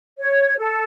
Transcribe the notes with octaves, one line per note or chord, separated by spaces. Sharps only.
C#5
A4